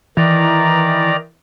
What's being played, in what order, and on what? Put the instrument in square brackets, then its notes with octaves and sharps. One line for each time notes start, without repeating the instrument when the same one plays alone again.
[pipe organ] D#3 D5 A#5 [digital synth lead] E3